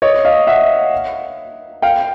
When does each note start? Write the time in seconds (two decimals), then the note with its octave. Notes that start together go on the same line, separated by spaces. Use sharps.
0.02 C#5 D#5
0.25 D#5 F5
0.47 E5 F#5
1.82 F5 G5